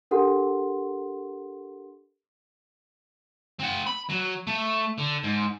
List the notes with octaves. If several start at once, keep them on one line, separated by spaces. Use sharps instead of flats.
D4 G4 A4 A#4 F#5 C6
C4 F#5
B5
F#3
A3
D3
G#2